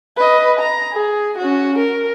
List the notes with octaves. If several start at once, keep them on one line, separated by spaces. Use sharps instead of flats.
B4 D#5
A#5
G#4
C#4 F#4
A#4